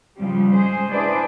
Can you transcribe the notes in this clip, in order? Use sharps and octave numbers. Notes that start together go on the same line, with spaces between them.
G#2 C#3 F3 G3
G#3 G#4 C5
D4 E4 G#4 B4 C5 D5